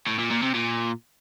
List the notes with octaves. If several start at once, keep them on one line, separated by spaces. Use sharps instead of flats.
A2
A#2
A#2
C3
A#2